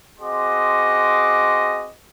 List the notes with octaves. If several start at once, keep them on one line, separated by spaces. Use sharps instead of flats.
C4 F#4 G#4 D#5 C6 D6